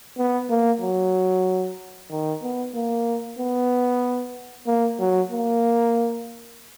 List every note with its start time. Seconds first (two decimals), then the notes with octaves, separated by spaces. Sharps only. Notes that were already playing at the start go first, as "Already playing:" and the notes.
0.18 B3
0.50 A#3
0.81 F#3
2.10 D#3
2.42 B3
2.74 A#3
3.39 B3
4.67 A#3
4.99 F#3
5.31 A#3